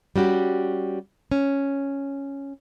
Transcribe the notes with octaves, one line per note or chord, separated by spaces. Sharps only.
G3 C#4 F#4 G4
C#4